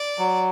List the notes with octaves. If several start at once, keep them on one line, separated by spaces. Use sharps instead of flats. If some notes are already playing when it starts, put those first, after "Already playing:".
Already playing: D5
F#3